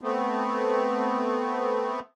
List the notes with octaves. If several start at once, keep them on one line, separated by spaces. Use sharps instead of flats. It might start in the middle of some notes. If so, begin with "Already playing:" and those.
A3 B3 C4